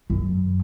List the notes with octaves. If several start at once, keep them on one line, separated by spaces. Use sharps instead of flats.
F#2